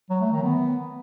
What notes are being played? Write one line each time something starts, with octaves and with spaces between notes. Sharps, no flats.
F#3
A3
D#3
B3